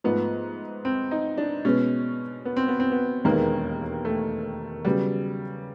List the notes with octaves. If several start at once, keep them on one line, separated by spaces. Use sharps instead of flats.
G#2 F3 A3 B3
C4
D#4
D4
B2 G#3 B3 C#4
B3
C4
B3
C4
B3
E1 D#2 D#3 G#3 A#3 B3
A3
C#3 F#3 G3 B3